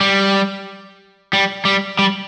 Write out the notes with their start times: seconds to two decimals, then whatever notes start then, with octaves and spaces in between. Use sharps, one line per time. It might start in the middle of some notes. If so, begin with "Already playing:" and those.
0.01 G3
1.33 G3
1.65 G3
1.99 G3